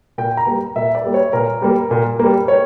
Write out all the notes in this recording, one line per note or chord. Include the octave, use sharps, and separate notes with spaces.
A#2 G5
A#5
G3 A#3
A#2 E5
D5
G3 A#3
C#5
A#2 A#4
G3 A#3
A#2
G3 A#3
C#5